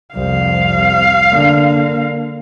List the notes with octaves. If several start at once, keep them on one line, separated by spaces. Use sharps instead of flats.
C2 F2 F5
D3 A#3